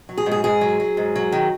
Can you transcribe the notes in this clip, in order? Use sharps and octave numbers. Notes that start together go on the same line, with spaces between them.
F#3
G#4
G#2
G#4
G#2 G#4
F#3
F#3
G#2
F#3
D#3